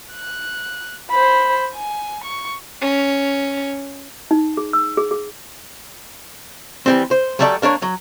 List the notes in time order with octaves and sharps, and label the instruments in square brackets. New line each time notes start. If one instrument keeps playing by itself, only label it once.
[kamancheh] F#6
C5 B5
G#5
C#6
[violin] C#4
[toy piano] D#4
G#4
E6
G#4
G#4
[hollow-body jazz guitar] E3 G3 C4
C5
F#3 G3 A3 A4 D5
A#3 D4 A#4 C#5
F#3